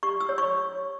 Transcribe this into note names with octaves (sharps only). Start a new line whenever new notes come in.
G4 C#6
E6
C#5
C#6